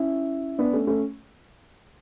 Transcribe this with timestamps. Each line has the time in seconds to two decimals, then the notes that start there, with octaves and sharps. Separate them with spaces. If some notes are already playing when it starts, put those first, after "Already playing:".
Already playing: C#4 E4
0.58 B3 D4
0.73 A3 C#4
0.87 A3 C#4